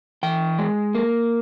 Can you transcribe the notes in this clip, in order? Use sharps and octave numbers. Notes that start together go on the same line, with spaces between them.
E3 G5
G#3
A#3